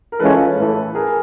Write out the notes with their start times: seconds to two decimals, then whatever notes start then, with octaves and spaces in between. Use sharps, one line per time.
0.12 A#4
0.19 E3 G#3 C#4 F4 A4 B4
0.57 A2 E3 A3
0.95 G#4 A#4